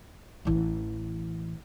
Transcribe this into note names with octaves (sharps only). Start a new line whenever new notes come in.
A1 E3